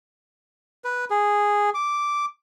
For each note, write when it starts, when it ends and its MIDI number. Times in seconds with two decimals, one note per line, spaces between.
0.84 1.05 71
1.10 1.70 68
1.74 2.25 86